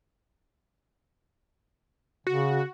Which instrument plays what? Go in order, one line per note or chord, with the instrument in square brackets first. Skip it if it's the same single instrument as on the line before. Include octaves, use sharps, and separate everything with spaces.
[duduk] C#3 [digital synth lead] F#4